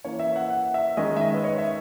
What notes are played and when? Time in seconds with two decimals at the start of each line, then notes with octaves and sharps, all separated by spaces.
0.04 E3 A#3 C#4 C#5
0.19 E5
0.36 F#5
0.50 F#5
0.74 E5
0.97 D#3 G#3 C#4 D#5
1.17 E5
1.21 D#5
1.34 B4
1.44 C#5
1.58 E5